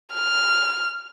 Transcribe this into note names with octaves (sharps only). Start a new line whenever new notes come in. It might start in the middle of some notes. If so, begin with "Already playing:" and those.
F6